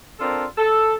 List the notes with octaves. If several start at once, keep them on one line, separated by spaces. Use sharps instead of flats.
C4 D4 F4 A4 A#4
A4